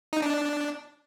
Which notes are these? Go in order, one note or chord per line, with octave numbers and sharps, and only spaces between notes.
D#4
D4